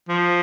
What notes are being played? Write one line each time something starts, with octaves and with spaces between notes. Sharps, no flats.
F3